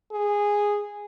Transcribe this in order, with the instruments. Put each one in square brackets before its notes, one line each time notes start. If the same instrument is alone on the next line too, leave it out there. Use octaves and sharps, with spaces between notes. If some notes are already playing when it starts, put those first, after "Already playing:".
[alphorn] G#4